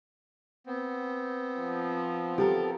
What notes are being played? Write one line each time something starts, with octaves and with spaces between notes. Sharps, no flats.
B3 C4
F3
G4 A4 A#4